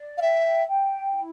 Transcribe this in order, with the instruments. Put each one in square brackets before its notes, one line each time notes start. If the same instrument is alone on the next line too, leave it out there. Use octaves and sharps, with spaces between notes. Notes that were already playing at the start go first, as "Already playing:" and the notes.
Already playing: [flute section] D5
[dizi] F5
[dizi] E5 [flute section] G5
[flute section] G5
E4